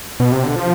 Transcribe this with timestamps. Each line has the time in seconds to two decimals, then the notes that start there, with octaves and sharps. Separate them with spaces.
0.20 B2
0.32 C3
0.44 D3
0.56 F3